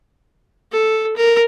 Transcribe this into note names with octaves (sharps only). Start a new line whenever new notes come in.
A4
A#4